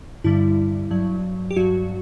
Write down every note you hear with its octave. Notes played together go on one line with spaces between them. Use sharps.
G2 D3 G3 E4
G2 F#3
G4
G2 F#3 F#4